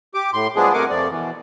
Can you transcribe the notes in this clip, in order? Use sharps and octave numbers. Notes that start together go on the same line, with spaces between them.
G4 D6
A2 C6
F3 G3 G#3 B3 D4 G#4
C3 A3 A#4 F#5 G#5 D6
F2 F3 A3 D5
B2 E3